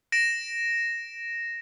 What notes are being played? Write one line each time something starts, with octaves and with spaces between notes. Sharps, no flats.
A#6 D7 E7